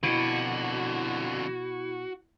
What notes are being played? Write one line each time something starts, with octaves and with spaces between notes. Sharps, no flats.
F2 B2 D3 E4 F#4